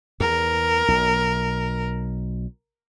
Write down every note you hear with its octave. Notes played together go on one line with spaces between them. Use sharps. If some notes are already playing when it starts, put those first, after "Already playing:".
E2 A#4
B1